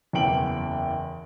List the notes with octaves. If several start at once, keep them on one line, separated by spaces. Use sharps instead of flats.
F#1 E2 E3 G5 D7 F#7